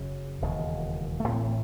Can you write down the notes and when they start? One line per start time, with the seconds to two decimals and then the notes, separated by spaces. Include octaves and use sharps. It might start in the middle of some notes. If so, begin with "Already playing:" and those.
Already playing: F#1 F#2 C#3
0.41 E1 D#2 C#3
1.20 A3
1.28 A1 A2 C4